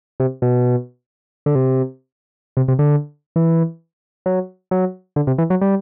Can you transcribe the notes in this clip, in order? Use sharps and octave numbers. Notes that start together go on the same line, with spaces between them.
C3
B2
D3
C3
C3
C3
D3
E3
F#3
F#3
D3
C3
E3
F#3
G3